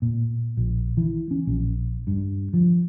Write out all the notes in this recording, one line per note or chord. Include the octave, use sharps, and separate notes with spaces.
A#2
A#1
E3
C#4
A#1
G2
F3